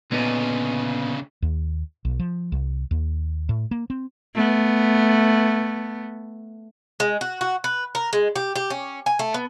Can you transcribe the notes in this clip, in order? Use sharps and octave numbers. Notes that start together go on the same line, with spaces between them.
D2 A#2 C#3 B3 D#4
D#2
B1
F3
C2
D#2
A2
A#3
C4
A3 B3
G#3
F#4
F#4
B4
A#4
G#3
G4
G4
C#4
G#5
A3
B3